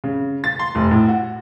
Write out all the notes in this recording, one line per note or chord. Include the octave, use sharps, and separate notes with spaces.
C#3
A6
C6
F1
A2
F#4